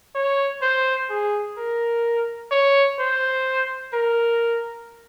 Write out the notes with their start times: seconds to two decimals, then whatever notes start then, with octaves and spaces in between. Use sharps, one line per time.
0.15 C#5
0.62 C5
1.10 G#4
1.58 A#4
2.51 C#5
2.99 C5
3.94 A#4